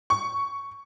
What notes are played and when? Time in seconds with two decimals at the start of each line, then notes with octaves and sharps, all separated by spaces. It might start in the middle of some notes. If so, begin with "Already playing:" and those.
0.10 C#6